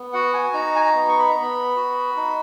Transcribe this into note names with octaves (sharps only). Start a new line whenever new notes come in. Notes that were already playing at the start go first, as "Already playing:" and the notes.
Already playing: B3
F#4 F#5
G#5
D#4 A#5
G#5
A#5
B3
C#6
B5
B3 A#5
B5
F#4
D#4